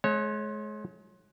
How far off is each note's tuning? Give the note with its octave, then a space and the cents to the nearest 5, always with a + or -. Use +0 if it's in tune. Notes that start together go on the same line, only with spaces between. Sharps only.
G#3 +35 C#5 -20